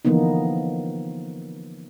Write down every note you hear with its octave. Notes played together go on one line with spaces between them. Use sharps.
D3 E3 F3 A#3 B3 D#4